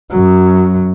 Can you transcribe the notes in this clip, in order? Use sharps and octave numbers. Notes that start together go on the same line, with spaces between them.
F#2 F#3